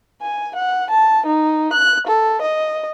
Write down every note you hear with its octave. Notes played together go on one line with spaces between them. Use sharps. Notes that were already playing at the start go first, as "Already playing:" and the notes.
G#5
F#5
A5
D#4
F#6
A4
D#5